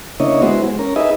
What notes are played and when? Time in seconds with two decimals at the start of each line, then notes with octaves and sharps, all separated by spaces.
0.20 C#3 A#3 D4 E4 C#5 D#5
0.42 G#3 B3 E4 F#4 C5
0.64 G#3
0.79 C#4 A#4
0.96 D#4 G#4 B4 D#5 E5